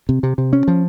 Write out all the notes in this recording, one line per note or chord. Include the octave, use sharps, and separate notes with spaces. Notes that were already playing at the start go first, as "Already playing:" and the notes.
C3
C3
C3
C#4
F3